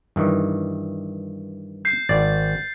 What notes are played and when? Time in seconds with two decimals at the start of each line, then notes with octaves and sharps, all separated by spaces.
0.16 G2 D#3 E3
1.85 G6 C7
2.09 G#1 D5 A6